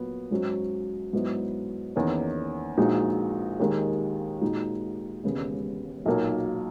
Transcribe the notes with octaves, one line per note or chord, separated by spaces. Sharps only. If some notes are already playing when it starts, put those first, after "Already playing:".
Already playing: A#2 F#3 B3
G#2 F#3 C#4 F#4
G#2 F#3 B3 E4
E2 D#3 A#3 C#4
A#1 A#2 G#3 D#4 F#4
D#2 D#3 G#3
A#2 G#3 D#4 F#4
E1 D#2 C#3 G#3 B3
B1 A#2 A#3 D#4 F#4